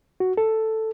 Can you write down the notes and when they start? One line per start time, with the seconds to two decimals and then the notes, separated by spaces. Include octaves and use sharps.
0.20 F#4
0.37 A4